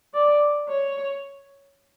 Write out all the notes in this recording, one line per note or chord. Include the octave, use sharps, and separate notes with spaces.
D5
C#5